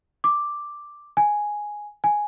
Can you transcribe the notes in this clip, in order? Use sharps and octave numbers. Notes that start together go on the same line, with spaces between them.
D6
G#5
G#5